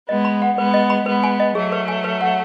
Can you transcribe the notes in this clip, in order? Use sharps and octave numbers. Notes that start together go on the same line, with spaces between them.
G#3 B3 D#5
B5
F#5
G#3 B3 B4
D#5
B5
G#3 B3 B4
G#5
D#5
F#3 A3 G#4
B4
G#5
B4
F#5